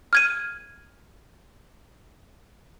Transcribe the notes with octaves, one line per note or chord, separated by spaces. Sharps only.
F6 G#6 D#7